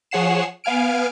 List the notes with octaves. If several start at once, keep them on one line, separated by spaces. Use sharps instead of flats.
F3 G#4 C#5 F#5 C7 E7
B3 F5 G#5 F6 D7